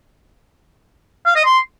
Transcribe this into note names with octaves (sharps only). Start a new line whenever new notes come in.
F5
D#5
C6